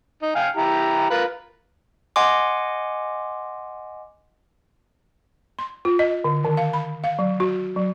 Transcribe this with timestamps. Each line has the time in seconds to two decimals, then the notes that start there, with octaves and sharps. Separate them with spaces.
0.22 D#4
0.35 F5 G5 G#5
0.56 E4 G4 A#5
1.10 F4 A#4 B4
2.16 D#5 F#5 G#5 C6 D6
5.59 C6
5.85 F4
5.99 D#5
6.24 D3
6.45 D#3
6.57 F5
6.73 B5
7.04 F5
7.19 F#3
7.40 F#4
7.76 F#3